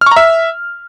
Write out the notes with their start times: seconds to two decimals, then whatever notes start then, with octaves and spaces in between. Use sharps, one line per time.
0.01 F6
0.06 C#6
0.11 A#5
0.16 E5